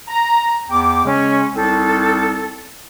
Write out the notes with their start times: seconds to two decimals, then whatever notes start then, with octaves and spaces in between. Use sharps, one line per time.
0.08 A#5
0.70 E2 G5 D6
1.05 C#3 G#3 C#4
1.54 C2 C4 D#4 A4